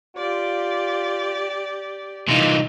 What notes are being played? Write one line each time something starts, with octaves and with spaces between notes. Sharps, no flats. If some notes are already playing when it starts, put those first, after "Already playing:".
F4 G4 D5
C2 A#2 E3 D#4 F4